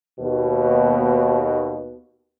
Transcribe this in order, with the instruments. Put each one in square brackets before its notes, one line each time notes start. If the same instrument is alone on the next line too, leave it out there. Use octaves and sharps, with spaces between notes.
[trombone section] D#2 B2